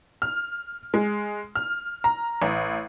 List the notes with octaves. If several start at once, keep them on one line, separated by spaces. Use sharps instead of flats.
F6
G#3
F6
A#5
A1